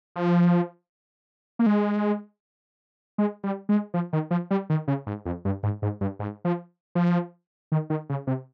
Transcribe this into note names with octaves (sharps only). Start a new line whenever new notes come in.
F3
A#3
G#3
G#3
G3
G#3
F3
D#3
F3
G3
D#3
C#3
G#2
F2
G2
G#2
G#2
G2
G#2
F3
F3
D#3
D#3
C#3
C3